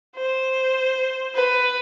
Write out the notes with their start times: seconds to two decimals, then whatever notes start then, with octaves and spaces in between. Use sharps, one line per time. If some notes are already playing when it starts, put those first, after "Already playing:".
0.17 C5
1.35 B4